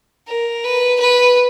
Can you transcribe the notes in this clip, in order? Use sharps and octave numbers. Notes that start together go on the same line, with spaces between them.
A#4
B4
B4